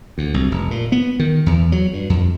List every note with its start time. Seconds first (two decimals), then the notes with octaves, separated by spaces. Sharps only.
0.18 D2
0.34 C2
0.51 F1
0.71 A#2
0.92 B3
1.19 D#3
1.46 E2
1.72 F#3
1.93 G2
2.10 F2